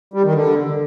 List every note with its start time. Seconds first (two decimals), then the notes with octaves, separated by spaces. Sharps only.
0.14 G3
0.24 D#3
0.34 D3